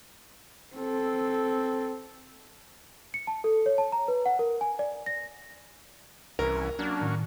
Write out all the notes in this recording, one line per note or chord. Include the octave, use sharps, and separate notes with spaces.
C4 A4
C#7
A5
A4
C#5
A5
A#5
B4
F#5
A#4
G#5
D5
A#6
C2 E3 C#4 A#4
F#3 A#3 C#4 D4
A2 D#3